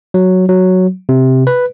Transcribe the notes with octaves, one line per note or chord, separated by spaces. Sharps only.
F#3
F#3
C3
B4